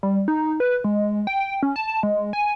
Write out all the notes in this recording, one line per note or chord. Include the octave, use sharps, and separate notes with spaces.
G3
D#4
B4
G#3
G5
C#4
A5
G#3
G#5